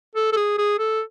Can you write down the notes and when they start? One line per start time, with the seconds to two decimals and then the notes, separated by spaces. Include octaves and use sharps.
0.16 A4
0.33 A4
0.37 G#4
0.58 G#4
0.79 A4